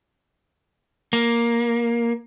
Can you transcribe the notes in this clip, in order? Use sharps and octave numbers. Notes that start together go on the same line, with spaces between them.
A#3